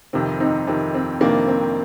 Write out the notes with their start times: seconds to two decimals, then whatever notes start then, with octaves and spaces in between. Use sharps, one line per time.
0.13 F2 C3 D#3 C4
0.40 C4 D#4
0.67 F2 C3 D#3 C4
0.94 C4
1.21 F2 C3 D#3 A#3 D4
1.48 C4